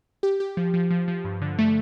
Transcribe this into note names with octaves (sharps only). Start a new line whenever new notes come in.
G4
G4
F3
F3
F3
F3
G2
D3
A3